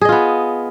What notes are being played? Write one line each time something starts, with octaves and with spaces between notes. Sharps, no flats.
B3 F4 G#4 D#5